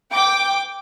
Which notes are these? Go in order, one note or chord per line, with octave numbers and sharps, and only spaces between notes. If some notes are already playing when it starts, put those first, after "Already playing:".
G5 D6